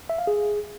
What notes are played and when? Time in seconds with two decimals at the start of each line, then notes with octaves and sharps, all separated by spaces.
0.10 E5
0.18 F5
0.27 G#4